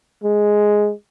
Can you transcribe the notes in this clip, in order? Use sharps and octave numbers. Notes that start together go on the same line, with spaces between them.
G#3